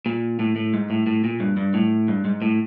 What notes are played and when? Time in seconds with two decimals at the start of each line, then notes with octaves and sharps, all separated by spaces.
0.06 A#2
0.39 A2
0.56 A2
0.74 G#2
0.90 A2
1.07 A2
1.24 A#2
1.40 G2
1.57 G2
1.74 A2
2.08 G2
2.25 G#2
2.42 A2